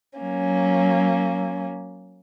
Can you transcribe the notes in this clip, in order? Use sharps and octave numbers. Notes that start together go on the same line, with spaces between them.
F#3 A#3 C#4